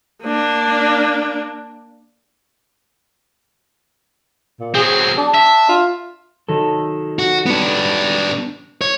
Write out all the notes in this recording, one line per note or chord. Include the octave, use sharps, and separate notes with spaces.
A#3 D4
A#2
F#3 C4 G#4
D4
E5
F4
D#3 F#3 A4
F#4
B3 D4
C#5